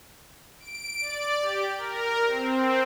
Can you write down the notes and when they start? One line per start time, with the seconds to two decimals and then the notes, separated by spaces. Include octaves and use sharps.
0.60 D7
1.01 D5
1.42 G4
1.78 A#4
2.26 C4